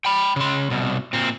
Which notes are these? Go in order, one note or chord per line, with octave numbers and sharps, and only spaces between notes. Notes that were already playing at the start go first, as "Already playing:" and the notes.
G5 B5
C#3 C6
C2 B2
A#2 C4